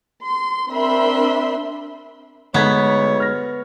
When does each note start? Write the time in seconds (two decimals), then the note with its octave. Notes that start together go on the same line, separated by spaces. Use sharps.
0.23 C6
0.69 C4 D4 A#4 E5 B5 C6
2.54 D2 G#3 B3 D#4 C#5 G#6 B6
3.20 F6 A#6